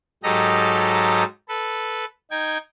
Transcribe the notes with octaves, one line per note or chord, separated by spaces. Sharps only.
G#2 F#3 G4 A4 D#5 A#5
A4 B4
D#4 G5 G#6